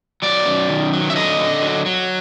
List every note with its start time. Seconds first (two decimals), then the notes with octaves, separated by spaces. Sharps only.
0.22 F#3 D5
0.46 F#2
0.69 D#3
0.93 F#3
1.10 E5
1.16 D3 D#5
1.39 D3
1.62 F#3
1.86 F#3